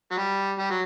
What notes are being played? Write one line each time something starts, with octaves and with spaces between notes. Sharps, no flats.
F#3
G3
G3
F#3